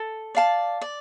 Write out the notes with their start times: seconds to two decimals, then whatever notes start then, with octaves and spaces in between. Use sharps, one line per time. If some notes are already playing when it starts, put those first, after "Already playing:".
Already playing: A4
0.35 D5 F5 A5
0.81 D5